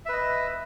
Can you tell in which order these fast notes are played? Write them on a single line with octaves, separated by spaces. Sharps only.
E5 B4 D#5